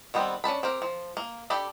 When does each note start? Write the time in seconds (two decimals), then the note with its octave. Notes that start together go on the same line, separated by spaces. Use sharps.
0.14 D#3 G3 B3 C4
0.44 C#4 D4 A5 B5
0.63 C4 G4 A#4
0.82 F3
1.17 A#3
1.50 D4 G4 A4 D5 B5